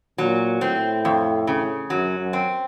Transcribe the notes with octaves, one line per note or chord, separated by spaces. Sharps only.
A#2 F#3
A2 C4
F2
C#3
F#2 F#3
F#2
C4